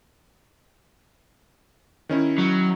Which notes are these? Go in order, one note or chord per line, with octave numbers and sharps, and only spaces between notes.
D#3 C#4 E4
F#3